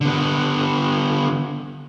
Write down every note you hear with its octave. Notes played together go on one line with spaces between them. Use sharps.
D3 B3